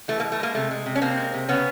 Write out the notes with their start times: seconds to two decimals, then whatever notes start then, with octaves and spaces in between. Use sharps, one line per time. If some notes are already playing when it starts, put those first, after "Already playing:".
0.08 E3 A3
0.20 A#3
0.24 G#3
0.32 A3
0.40 G#3 A#3
0.55 C3 A3
0.71 G#3
0.86 C3
0.96 C#4
1.02 C3 A#3 C4
1.17 G#3
1.34 C3
1.49 C#3 B3 C#4